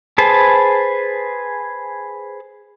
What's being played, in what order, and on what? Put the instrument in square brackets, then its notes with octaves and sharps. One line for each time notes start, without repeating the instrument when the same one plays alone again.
[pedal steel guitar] G#4 B4 C5 A5